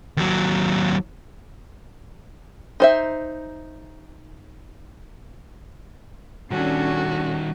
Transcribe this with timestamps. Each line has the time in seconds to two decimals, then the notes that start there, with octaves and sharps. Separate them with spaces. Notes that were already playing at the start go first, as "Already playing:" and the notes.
0.17 D#2 F#3
2.80 D#4 C5 E5
6.51 D#3 G3 C#4 D4 F#4 A4